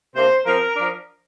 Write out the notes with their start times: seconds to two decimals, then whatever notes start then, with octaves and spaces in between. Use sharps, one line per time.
0.15 C3 A#3 D4 C5
0.45 F3 C4 A#4
0.76 F3 D4